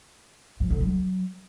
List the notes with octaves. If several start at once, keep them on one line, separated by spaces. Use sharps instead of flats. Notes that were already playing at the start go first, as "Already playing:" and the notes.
F3
D3
F#3